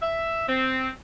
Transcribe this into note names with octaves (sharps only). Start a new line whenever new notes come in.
E5
C4